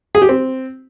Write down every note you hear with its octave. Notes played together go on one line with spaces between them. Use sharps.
G#4
G4
C4